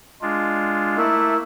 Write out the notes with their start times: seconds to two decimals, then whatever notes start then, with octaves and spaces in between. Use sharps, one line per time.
0.21 G#3 D4 F4
0.97 A3 A#3 E4